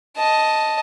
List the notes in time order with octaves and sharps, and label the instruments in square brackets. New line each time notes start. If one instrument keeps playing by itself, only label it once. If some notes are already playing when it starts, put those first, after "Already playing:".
[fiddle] D#5 A5